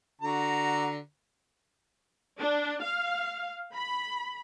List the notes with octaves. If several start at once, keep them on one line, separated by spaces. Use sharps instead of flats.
D3 F#4 A#5
D4
F5
B5